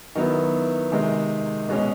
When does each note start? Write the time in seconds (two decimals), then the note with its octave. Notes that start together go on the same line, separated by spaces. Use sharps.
0.15 D#3 F#3 B3 E4
0.92 C3 D#3 G#3
1.69 B2 G#3 C#4